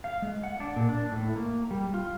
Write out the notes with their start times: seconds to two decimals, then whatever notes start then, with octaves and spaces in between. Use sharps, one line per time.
0.04 F5
0.22 G#3
0.43 F#5
0.60 D4
0.76 A#2
0.89 D4
1.12 A2
1.36 A#3
1.71 G3
1.94 F4